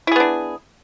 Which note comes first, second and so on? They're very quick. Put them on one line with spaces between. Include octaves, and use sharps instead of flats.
E4 G#4 B3 D4